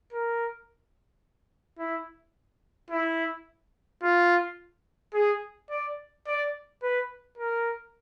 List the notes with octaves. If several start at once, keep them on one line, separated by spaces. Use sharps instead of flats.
A#4
E4
E4
F4
G#4
D5
D5
B4
A#4